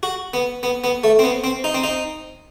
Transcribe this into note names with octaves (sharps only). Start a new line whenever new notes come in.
F#4
B3
B3
B3
A3
C4
B3
C4
D#4
C4
D#4